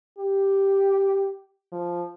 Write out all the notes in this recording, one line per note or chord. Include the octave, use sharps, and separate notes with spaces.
G4
F3